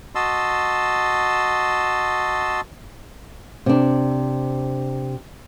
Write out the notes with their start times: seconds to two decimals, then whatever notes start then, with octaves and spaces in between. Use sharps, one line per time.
0.15 F#4 D#5 A5 C6 E6
3.66 C3 D4